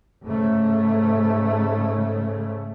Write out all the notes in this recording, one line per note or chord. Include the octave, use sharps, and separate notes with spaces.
G#2 C#3 A3